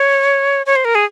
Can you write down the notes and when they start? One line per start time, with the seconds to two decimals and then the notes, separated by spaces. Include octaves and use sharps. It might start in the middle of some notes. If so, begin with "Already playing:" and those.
Already playing: C#5
0.66 C#5
0.76 C5
0.85 A#4
0.95 G#4